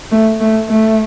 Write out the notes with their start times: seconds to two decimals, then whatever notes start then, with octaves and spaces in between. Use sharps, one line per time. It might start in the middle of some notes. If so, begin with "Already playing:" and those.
0.12 A3
0.41 A3
0.69 A3